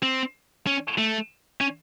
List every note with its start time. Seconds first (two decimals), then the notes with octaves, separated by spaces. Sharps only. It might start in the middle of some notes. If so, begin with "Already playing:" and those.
0.03 C4
0.67 C#4
0.98 A3
1.61 C#4